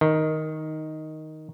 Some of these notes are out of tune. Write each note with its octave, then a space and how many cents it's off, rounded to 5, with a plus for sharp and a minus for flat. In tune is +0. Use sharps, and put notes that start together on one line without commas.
D#3 +5